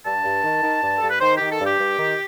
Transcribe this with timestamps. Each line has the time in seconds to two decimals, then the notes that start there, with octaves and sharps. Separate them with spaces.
0.05 G2 A5
0.25 G2
0.44 D#3
0.63 D#3
0.82 G2
0.98 G2 A4
1.10 B4
1.21 D#3 C5
1.36 D#3 G4
1.50 A4
1.60 G2
1.65 G4
1.79 G2
1.98 D#3